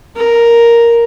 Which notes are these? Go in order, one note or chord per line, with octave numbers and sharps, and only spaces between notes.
A#4